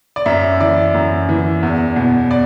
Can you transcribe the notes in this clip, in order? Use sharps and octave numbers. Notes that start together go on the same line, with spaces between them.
D5
F#2 E5
E3 D5
F#2
E3
E2
B2
D5